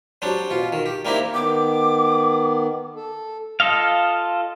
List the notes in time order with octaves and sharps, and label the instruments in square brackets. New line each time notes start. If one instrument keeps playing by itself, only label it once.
[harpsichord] F#3 G3 C4 D4
B2 F4
D#3
G4
G3 A#3 C4 D#4 E4 G4
[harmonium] D#3 B3 [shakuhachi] D6
[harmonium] A4
[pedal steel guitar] F4 A4 D#5 F5